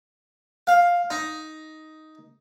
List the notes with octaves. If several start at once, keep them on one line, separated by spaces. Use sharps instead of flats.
F5
D#4